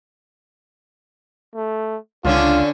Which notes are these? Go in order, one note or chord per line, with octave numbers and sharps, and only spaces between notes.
A3
C#2 D3 C#4 D4 F4